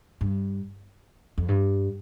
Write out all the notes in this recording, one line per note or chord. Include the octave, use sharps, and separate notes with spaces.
G2
F2
G2